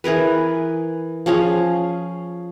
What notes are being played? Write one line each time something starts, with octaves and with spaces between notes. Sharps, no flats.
E3 G#4 A#4 B4
F3 C#4 G#4 F5